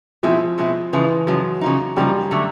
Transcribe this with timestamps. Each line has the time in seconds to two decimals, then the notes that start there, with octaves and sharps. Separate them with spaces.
0.23 B2 F3 G#3 C4 E4
0.58 B2 G#3 C4 E4
0.93 C#3 E3 F3 G#3
1.27 C#3 F3 F#3 G#3
1.61 C#3 F3 A#3 D#4
1.96 C#3 F3 G3 A#3 D#4
2.31 D3 F#3 A3